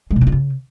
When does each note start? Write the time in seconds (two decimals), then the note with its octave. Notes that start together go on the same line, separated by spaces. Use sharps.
0.11 G#3
0.16 B2
0.21 A#3
0.27 F4
0.32 C#3